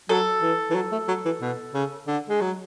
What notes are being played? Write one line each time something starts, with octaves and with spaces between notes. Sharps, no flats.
F#3 A4
E3
E3
F#3
A3
F#3
E3
B2
C#3
D3
G#3
F#3